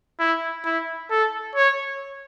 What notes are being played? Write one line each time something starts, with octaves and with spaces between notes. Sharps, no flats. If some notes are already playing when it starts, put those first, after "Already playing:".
E4
E4
A4
C#5